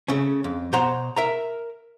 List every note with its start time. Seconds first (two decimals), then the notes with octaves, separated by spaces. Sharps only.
0.08 C#3 A3 C#4
0.44 F2
0.73 B2 C5 C#5 F#5 A#5 C6
1.16 A#4 E5 A#5